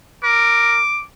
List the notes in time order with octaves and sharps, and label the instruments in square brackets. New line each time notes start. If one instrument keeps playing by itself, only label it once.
[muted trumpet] A#4 [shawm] D6